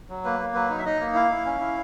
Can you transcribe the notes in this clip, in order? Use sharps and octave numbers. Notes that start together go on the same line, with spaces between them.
F#3
A#3 B4
A#3
F#3 B4
D#4
E5
D#4 D#5
A#3
E4 F5
E4
C#4
E4